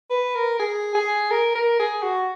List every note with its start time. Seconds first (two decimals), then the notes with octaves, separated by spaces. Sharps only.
0.10 B4
0.36 A#4
0.59 G#4
0.95 G#4
1.31 A#4
1.55 A#4
1.80 G#4
2.03 F#4